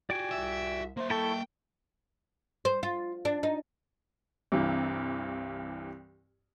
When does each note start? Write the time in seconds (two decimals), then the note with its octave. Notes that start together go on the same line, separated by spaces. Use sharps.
0.10 F#4 G4 D5 G5 G#5
0.31 C2 E5
0.97 A#3 C5 E5
1.10 E4 A4 G5 A5 C#6
2.65 C5
2.83 F4
3.25 D4
3.43 D#4
4.52 C2 G2 E3